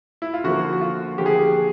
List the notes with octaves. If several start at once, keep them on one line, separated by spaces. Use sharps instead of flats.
E4
F4
D3 F3 A#3 F#4
F#4
F4
D3 F3 A#3 G4
G#4
G4